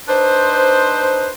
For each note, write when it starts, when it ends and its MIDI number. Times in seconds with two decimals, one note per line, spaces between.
0.08 1.29 62
0.08 1.29 63
0.08 1.29 71
0.08 1.29 72